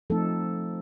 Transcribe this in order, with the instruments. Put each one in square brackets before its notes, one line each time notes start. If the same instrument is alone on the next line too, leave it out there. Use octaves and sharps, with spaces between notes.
[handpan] F3 A3 C4 D#4 A4